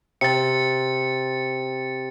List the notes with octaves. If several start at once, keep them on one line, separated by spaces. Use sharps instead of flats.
C3 A6 C#7